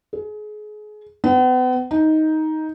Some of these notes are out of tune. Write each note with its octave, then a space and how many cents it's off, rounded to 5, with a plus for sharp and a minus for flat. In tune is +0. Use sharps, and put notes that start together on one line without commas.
G#4 +30
B3 +40
D#4 +10